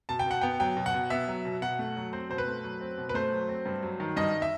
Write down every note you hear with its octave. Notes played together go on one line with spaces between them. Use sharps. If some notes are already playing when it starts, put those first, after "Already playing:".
B2 A5
G5
B2 F#5
B3 G5
F#3 G5
B2
F#5
B2
B3 E5
F#3
B2
B2 F#5
A3
F#3
C4 C5
B2 C5
B4
A3
F#3
C4
B2
B4
A3 C5
F#3
C4
G2
F#3
D#3
G2 D#5
E5